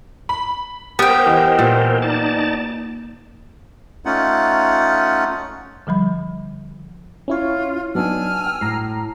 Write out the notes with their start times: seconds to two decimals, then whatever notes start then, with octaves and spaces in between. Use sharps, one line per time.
0.29 B5
0.99 B3 G4 A#4 C5 G5
1.26 E3 D#5
1.59 A#2
2.02 D#4 D5 A5
4.05 A3 C#4 D#4 F4 F#5
5.87 D3 F3 G3 B5
7.28 C#4 E4 F4 C#5
7.95 F#3 B3 D4 D#4 G#5 E6 F6
8.46 G5
8.61 A2 A#5 C7